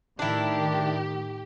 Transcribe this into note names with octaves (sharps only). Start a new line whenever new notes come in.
A2 D#3 D4 E4 G4